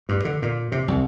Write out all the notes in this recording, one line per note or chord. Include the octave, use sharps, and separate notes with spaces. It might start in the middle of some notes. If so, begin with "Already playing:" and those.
G2
D3
A#2
C3
C2